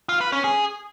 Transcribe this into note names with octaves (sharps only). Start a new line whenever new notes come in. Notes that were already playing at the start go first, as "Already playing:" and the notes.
F4
B4
C#4
G#4